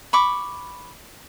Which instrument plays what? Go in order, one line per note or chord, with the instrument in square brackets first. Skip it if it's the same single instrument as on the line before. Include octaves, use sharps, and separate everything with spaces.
[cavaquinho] B5 C#6 D6